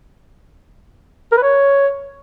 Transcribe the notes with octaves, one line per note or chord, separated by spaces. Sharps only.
A#4
B4
C#5